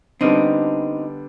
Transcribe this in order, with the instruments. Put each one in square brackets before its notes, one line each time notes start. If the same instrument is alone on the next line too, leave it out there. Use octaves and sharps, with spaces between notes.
[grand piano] D3 G3 B3 D4 [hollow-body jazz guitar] C4 D#4